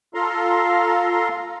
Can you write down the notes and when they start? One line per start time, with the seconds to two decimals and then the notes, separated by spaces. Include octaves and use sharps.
0.14 F4 A4 F5 A#5 C6